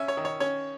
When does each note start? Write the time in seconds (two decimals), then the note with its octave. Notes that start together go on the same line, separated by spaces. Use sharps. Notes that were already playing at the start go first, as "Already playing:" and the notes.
Already playing: C#3 C#4 E5
0.08 C#5
0.17 D#3
0.25 C#5
0.40 C#4 C#5